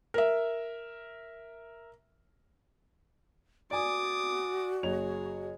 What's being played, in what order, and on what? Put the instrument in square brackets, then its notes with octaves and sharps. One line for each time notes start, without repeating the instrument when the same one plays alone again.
[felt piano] A#4 E5
[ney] F#4 [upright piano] D5 G#5 [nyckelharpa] D6 D#6
[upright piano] F#1 C#5 F7 [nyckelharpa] G#4